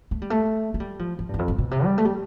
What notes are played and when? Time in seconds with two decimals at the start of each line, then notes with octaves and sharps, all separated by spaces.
0.11 A3
0.22 G3
0.30 A3
0.74 A3
0.80 G3
0.99 F3
1.19 F3
1.29 G2
1.34 E2
1.39 F2
1.48 G2
1.58 B2
1.71 C3
1.85 G3
1.98 A3
2.05 G3